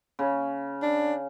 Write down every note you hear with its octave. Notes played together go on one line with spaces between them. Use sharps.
C#3
D4